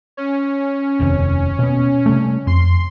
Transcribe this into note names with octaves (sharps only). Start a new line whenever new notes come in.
C#4
F1 D#2 C3
B2 B3
C3 G3 A3
F2 C6